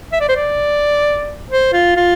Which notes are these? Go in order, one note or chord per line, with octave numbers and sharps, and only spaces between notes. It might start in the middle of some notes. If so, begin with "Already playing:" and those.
E5
D5
C5
D5
C5
F4
F4